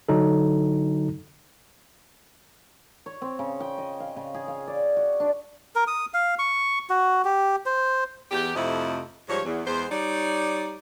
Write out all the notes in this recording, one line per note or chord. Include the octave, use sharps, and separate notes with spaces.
D3 F#3 D#4 A4
C#5
C4
C#3
G5
D#5
F5
C#3
G#4
F5
D5
F#4
D4
A#4
D#6
F5
C#6
F#4
G4
C5
E2 G4
F2 C3 F3 A3 E4 D#5
G#2 F3 G3 C#5
E2
E2 G#3 B3 C5
G3 D#4 C#5 D5